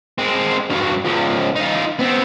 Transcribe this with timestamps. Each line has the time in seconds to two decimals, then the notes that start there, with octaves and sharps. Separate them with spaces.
0.18 G#3 C4
0.70 G2 F#3
1.05 C#2 F3
1.56 D#4 F4
1.99 B3 C4